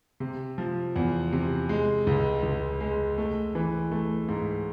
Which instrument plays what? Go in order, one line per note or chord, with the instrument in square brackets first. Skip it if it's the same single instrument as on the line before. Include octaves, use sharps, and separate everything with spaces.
[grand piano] C3
F3
E2
C3
G#3
C#2
C#2
G#3
A3
E3
A3
G#2